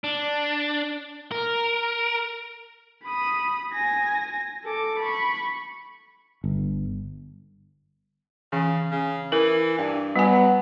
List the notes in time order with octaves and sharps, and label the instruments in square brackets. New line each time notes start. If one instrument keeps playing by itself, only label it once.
[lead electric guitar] D4
A#4
[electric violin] B5 D#6
G#5 A#6
A4 D6
B5 C#6
[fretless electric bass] G1
[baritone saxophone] C#3 [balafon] E3
[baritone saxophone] C#3
[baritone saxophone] E3 [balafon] A#4
[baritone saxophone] G2
[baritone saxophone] F#3 [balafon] G3 G#5 [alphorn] B3